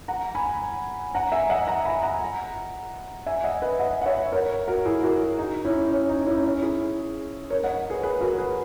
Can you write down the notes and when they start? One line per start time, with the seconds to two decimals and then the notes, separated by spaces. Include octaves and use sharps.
0.08 F#5 A#5
0.35 G#5 B5
1.15 F#5 A#5
1.32 E5 G#5
1.49 D#5 F#5
1.67 F#5 A#5
1.85 G#5 B5
2.03 F#5 A#5
3.26 E5 G#5
3.44 D#5 F#5
3.62 B4 D#5
3.79 D#5 F#5
4.02 F#5
4.06 C#5 E5
4.32 A#4 C#5
4.68 F#4 A#4
4.85 E4 G#4
5.03 F#4 A#4
5.39 D#4
5.65 C#4 E4
5.91 C#4
6.09 D#4
6.26 C#4 E4
6.36 D#4
6.44 C#4
6.62 E4 G#4
7.50 A#4 C#5
7.64 D#5 F#5
7.90 G#4 B4
8.03 G#4 B4
8.21 F#4 A#4
8.38 G#4 B4